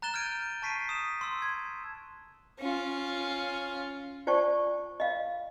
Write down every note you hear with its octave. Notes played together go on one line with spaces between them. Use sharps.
A#5 F#6 A6 E7 G7
F6 G6 G#6 D7 D#7
A5 C#6 B6 C7 D7 D#7
D#6 B6 E7
C6 E6
G#6
C#4 F4
F4 C5 D5 A5 C#6
D#5 F5